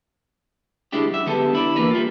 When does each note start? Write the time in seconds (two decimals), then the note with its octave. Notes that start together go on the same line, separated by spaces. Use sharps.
0.92 C#2 C3 G#3 D4 E4 G4
1.11 F#2 E5
1.26 D3 G#3 B3 G4 A4
1.53 D3 E4 D5
1.76 D3 E3 A#3 C#4 A#4 B4
1.91 G3 F4